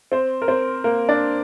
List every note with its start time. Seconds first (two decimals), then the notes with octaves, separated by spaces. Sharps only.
0.12 C4 C5
0.42 A#4
0.48 C4 C5
0.84 A#3 A#4
1.09 D4 D5